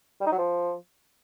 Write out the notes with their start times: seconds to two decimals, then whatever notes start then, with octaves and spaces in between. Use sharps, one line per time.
0.21 G3
0.26 D#4
0.32 F#3
0.38 F3